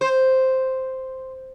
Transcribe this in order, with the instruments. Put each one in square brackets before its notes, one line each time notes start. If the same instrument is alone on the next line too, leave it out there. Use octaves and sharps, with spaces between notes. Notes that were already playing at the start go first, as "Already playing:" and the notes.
[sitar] C5